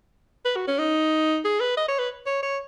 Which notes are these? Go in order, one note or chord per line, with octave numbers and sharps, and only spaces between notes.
B4
F#4
C#4
D#4
G#4
B4
D#5
C#5
B4
C#5
C#5